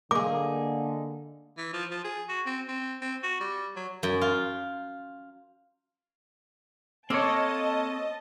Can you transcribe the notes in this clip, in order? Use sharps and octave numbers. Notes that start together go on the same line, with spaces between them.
D3 A#3 D#4 G#4 D6
E3
F3
F3
G#4
F#4
C4
C4
C4
F#4
G3
F#3
F#2
F4
A#3 C4 A4 C#5 D#5 A5